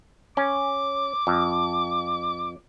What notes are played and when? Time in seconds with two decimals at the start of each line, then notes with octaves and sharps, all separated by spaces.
0.37 C#4 D6
1.27 F2